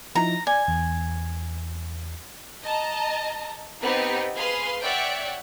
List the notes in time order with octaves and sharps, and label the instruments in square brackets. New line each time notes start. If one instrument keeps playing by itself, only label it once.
[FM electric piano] F3 D#4 E4 [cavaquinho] A#5
[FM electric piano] D5 G#6 [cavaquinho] G#5
[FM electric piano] E2
[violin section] D#5 A5 A#5
B3 C4 D#4 G4 B4
G#4 B4 F5 C6
C#5 D5 E5 F#5 G5